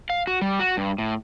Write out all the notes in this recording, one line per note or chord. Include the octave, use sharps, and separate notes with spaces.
F5
F#4
G3
F#4
G2
A2